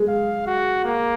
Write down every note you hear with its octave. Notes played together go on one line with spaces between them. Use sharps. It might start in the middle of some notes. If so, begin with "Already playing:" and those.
Already playing: G#3
F5
F#4
A#3